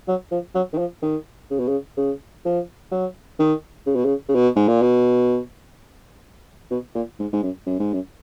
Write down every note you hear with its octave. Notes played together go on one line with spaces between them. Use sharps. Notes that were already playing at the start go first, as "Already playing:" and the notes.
F#3
F3
F#3
D#3
F3
D#3
C#3
B2
C#3
C#3
F3
F#3
D#3
C#3
B2
C#3
C#3
B2
G#2
A#2
B2
B2
A#2
G#2
G#2
F#2
F#2
G#2
F#2